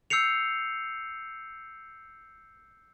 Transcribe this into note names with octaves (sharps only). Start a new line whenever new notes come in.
E6 G6 C7 C#7 F7